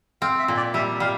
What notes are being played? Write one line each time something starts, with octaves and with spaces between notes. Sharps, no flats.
C4 F5
E5
A#2
D5
G3 E5
G3 F5